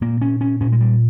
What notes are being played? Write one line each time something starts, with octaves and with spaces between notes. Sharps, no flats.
A#2 A#3
C#4
C#4
A#2 C#4
G#3
G3